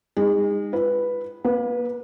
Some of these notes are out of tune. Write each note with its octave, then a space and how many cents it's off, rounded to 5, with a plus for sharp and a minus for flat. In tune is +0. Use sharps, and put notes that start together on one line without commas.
G#3 -35 D#4 +0
F4 -30 B4 +0
A#3 +30 B4 -15